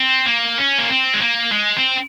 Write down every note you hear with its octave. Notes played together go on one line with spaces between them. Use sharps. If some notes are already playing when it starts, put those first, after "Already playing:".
Already playing: C4
A#3
C#4
A#3
C4
G#3
A#3
G#3
C4